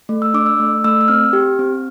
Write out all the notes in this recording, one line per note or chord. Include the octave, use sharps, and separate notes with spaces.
A3
E6
D4 D6
E6
A3
A3 E6
E6
C4 F6
G4
C4